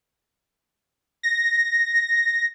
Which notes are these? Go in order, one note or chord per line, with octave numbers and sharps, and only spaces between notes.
A#6